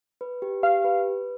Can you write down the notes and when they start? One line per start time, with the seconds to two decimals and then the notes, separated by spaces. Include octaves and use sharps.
0.21 B4
0.42 G4
0.63 G4 F5
0.85 B4